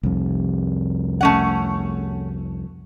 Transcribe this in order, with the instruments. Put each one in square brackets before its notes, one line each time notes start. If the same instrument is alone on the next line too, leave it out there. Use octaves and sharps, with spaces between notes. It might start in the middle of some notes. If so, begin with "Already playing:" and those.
[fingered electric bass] C2 F2
[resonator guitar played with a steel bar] A3 C#4 F#5